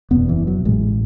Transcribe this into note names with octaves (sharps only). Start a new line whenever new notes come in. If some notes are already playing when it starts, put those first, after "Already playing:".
F#1 E2 B2 B3
E3
F#3
A1 A2 G#3